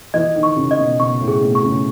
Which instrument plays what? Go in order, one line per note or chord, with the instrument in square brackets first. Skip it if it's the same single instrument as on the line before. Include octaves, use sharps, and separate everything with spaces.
[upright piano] E3 [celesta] D#5
[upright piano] D#3
[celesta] C#6
[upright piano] C#3
[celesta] D#5
[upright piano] B2
[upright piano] B2 [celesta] C#6
[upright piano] A2
[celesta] G#4
[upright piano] B2
[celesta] C#6
[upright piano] C#3